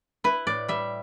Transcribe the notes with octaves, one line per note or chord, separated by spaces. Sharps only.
E4 B4
A2 D5
G3 E5